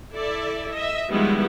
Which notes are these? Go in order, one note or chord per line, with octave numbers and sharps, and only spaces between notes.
E4 A4 D5 E5
D#5 E5
D#3 F3 G3 G#3 B3 E4